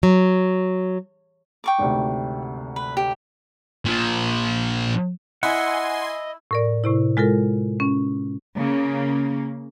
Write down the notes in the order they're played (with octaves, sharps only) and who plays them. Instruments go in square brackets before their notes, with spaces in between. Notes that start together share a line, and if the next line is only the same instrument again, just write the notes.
[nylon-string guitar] F#3
[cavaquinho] G5 C#6 D6
[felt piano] G#1 D2 C3
[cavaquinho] B4
G4
[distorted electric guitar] A#2 F3
[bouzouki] E4 [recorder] D#5 [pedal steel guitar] F#5 [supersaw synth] G#5 C6
[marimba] A2 A#4 D5
A2 C3 E4
G#3 F4 A4 A#4
C#4
[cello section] C#3 A#3